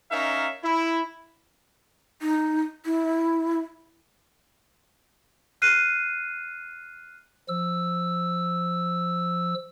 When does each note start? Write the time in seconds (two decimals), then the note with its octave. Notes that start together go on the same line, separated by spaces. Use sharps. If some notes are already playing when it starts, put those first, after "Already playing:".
0.11 C#4 D#4 A#4 E5 F5
0.63 E4
2.22 D#4
2.85 E4
5.62 F6 F#6 C7 D#7
7.48 F3 E6